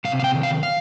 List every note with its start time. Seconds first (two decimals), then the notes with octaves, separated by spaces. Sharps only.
0.05 C3 F5
0.20 F5
0.24 G5
0.34 D#3
0.43 F5
0.63 F5